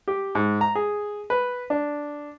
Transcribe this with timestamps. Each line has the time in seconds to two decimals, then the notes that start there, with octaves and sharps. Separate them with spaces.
0.08 G4
0.35 G#2
0.61 A#5
0.75 G#4
1.30 B4
1.70 D4